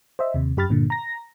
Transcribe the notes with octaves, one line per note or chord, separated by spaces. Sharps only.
C5 D#5 E5
D#2 C3
F#2 G4 B5 F6 A6
G2 A#2 D3
A#5 A#6